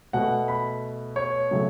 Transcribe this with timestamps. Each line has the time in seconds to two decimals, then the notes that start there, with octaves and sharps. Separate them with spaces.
0.13 B2 A3 F#5
0.48 B5
1.16 C#5
1.51 C#3 F#3 A3